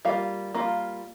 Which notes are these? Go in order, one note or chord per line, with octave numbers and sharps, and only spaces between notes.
G3 A#3 F4 F5
G3 A#3 F4